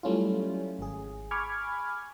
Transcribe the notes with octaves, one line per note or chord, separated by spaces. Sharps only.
F#3 G3 A3 C#4 E4 F4
G#1 G#4
G#5 B5 C#6 D6 F6 G#6